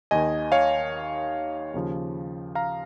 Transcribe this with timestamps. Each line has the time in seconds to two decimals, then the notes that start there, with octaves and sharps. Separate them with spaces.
0.11 D#2 D#3 D#5 G#5
0.52 C#5 F5
1.74 D#2 C#3 F3
2.55 F5 A#5